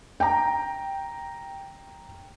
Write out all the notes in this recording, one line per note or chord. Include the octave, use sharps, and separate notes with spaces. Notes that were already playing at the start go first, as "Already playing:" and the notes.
G5 A#5